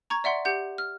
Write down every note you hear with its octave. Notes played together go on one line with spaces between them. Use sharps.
A#5 C#6 G#6
D5 E5 F#5 C6
G4 F#5 G6
F6